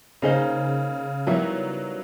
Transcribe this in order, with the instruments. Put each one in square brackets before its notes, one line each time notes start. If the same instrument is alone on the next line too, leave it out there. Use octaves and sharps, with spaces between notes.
[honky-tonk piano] C#3 [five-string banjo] A#3 D#4 G#4 C5 D#5
[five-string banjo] D#3 G3 B3 E4 [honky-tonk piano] F#3